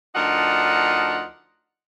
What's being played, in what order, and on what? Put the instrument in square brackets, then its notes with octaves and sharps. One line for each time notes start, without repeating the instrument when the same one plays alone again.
[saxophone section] D2 F3 D4 D#4 A#4 F#5